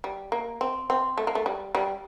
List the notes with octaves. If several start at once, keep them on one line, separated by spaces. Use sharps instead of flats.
G3
A#3
C4
C4
A3
A#3
A3
G3
G3